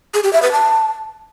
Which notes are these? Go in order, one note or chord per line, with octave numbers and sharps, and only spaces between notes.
G#4
G4
E5
B4
A5